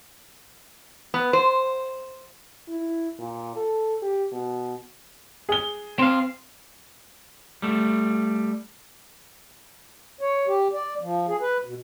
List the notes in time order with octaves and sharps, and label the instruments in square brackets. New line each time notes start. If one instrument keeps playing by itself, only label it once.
[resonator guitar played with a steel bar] B3
C5
[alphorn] E4
A#2
A4
G4
B2
[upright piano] G#4 G7
[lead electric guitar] C4 F5
[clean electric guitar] G3 A3
[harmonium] C#5
G4
D5
F3
G#4
B4
B2